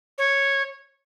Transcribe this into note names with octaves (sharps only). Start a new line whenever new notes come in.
C#5